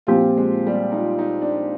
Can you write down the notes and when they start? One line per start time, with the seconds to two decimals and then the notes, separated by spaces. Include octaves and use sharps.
0.07 A#2 F3 C4 F4 G4
0.37 G#3
0.67 G3
0.92 D#4
0.97 F4
1.19 D#4
1.42 D4